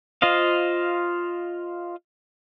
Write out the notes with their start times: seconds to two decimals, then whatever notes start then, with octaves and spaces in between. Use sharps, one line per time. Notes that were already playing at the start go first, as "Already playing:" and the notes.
0.22 F4 C5 D#5 F5